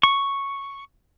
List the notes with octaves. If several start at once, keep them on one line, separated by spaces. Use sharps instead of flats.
C#6